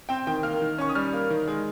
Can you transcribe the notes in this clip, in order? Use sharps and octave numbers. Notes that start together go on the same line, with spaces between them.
C4 G5
D#3 G5
A#3 F6
D#3
C#4 C#6
D#6
G3 F6
A#3
D#3
G#3